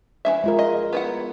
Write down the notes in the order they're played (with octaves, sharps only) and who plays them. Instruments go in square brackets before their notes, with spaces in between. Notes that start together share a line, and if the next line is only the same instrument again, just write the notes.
[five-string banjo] E3 C#4 E5
[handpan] G#3 F4 A#4
[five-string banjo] D#5
B3 E4 F#5